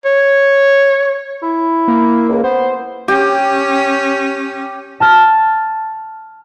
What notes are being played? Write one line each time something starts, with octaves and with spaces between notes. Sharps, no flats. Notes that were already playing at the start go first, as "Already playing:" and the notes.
C#5
E4
A#3
C#2
B3 C5
C#4 G4
A5 F6 A6